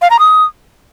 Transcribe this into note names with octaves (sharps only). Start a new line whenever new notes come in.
F5
A#5
D#6